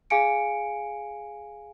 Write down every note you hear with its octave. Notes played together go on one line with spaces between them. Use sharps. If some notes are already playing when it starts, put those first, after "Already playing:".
G#4 F5 G#5 C#7 D7